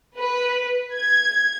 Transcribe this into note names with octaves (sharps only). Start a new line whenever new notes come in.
B4
G#6